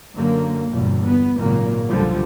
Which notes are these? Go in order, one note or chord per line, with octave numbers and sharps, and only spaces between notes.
F#2 D3 A#3
G1 E2 B2
B3
G#1 A#2 C#3 F#3 A#3
C2 F#2 D3 F3 G3